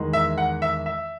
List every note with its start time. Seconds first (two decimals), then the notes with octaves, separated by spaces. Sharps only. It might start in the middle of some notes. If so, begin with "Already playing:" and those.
Already playing: E2 D#3 G#3
0.13 E5
0.38 F#5
0.62 E5
0.86 E5